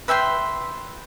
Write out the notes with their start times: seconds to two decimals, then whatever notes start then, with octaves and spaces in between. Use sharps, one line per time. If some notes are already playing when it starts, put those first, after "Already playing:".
0.08 B4 E5 G5 C6